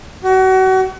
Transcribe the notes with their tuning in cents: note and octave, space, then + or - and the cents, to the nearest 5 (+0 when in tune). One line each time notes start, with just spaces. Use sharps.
F#4 +30